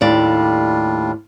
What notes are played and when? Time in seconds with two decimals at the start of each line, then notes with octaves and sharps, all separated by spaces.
0.01 D#2 A2 G3 D4 F4 D5